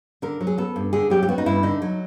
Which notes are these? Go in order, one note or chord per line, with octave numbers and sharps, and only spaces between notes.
D3 A#4
F#3
G#4
B3 A4
G2
D3 G#4
F#3 G4
G4
B3 F#4
D#4
G2 E4
D3 D#4
F#3